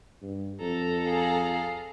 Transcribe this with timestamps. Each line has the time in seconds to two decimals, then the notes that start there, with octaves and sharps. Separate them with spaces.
0.23 G2
0.60 F2 A4 A#5
1.08 G#4 F5